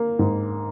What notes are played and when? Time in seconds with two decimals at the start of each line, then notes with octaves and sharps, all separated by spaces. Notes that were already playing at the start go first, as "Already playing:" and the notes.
Already playing: A#3
0.19 G#2